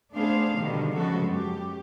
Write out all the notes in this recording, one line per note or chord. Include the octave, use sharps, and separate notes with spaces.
A3 B3 D4 G#4 C5 F5
B2 D3 D#3 G3 B3
C#3 F3 G#3 B3 F#4 A4
F#2 G4